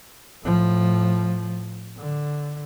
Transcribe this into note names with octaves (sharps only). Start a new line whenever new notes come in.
A2 F3
D3